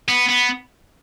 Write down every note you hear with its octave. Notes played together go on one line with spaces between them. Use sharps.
B3
B3